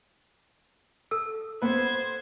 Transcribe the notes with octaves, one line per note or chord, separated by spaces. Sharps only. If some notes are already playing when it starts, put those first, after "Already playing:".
A4 E6
B3 B4 C5 G#6